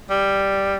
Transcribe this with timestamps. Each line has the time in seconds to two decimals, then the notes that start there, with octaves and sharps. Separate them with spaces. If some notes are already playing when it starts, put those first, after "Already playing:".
0.10 G3